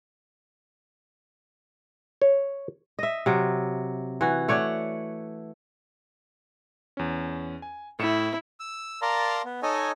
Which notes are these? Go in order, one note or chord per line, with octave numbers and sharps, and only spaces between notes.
C#5
D#5 E5
C3 F#3
E3 F#4
A3 C#5 D5 F#5
E2 C#4
G#5
A2 E4 C#7 E7
E6
A#4 D5 F5 A5 A#5 C6
B3
D#4 A4 C#5 D#5 G#5